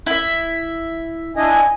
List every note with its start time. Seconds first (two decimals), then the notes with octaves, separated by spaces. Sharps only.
0.06 E4 E5
1.36 D4 E4 D#5 G#5